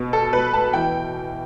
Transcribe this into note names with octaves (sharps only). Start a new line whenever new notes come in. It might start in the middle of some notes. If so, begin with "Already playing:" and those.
Already playing: B2
A4
B2 B4
A5
E3 G5